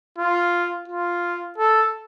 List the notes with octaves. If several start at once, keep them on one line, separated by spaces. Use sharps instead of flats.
F4
F4
A4